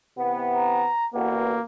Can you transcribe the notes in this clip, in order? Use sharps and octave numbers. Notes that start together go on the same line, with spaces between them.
C3 E3 B3
A#5
A1 A#3 B3 F#4